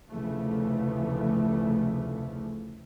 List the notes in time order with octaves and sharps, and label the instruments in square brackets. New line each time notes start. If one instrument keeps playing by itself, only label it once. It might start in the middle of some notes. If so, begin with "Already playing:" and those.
[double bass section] F1 D2 C#3 E3 F3 A3